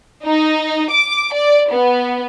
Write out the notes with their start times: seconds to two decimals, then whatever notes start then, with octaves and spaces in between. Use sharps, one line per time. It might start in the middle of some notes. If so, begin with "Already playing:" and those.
0.25 D#4
0.91 D6
1.34 D5
1.71 B3